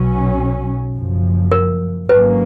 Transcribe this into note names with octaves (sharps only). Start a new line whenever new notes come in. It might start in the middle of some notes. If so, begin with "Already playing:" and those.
Already playing: B1 B2 F#3 C#4
F#1 F#2 F3
A#4
G#1 G#2 F#3 A#3 C#4 B4